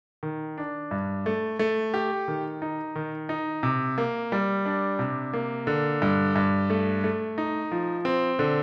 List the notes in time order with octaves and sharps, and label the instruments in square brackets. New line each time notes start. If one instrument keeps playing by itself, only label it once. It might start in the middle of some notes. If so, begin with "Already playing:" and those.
[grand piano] D#3
D4
G2
A3
A3
G4
D#3
D#4
D#3
D#4
C3
A#3
G3
D4
C3
A#3
D3
G2
G2
A3
A3
D#4
F3
C4
D3